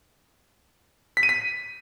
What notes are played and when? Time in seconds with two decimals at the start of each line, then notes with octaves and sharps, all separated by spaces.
1.17 B6
1.23 D#7
1.29 B6